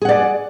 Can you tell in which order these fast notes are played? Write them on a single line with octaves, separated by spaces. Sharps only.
G#4 F#5 D5